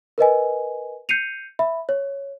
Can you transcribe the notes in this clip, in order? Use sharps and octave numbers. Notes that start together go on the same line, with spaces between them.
A#4 B4 D#5 G#5
G6 C7 C#7 D#7 F7
E5 B5
C#5